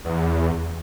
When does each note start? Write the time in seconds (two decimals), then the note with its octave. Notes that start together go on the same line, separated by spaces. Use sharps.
0.05 E2